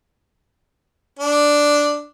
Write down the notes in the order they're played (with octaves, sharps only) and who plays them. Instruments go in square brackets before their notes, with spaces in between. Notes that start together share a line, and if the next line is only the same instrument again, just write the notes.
[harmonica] D4